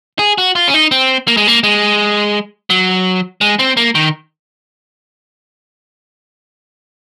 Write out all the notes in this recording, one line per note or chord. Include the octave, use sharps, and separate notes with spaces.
G#4
F#4
F4
C#4
D#4
C4
A#3
G#3
A#3
G#3
F#3
G#3
C4
A#3
D#3